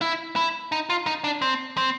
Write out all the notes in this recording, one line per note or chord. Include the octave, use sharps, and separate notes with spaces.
E4
E4
D#4
F4
D#4
D4
C4
C4